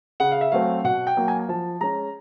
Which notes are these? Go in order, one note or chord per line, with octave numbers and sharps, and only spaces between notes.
C#3 F#5
F5
E5
F#3 A3 C4 F5
B2 F#5
G5
F#3 A#3
G#5
G#5
F3 A5
G#3 C#4 A#5